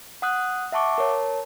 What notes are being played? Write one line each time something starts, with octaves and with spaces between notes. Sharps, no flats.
F#5 D#6 F#6
E5 F#5 A5 C#6 D6
A#4 C#5 A5